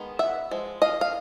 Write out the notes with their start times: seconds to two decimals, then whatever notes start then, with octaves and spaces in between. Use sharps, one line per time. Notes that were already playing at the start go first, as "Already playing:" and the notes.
Already playing: D#3 G#3 B3 D#4
0.19 E5 F#5
0.51 F3 G#3
0.82 D#5 F5
1.01 F5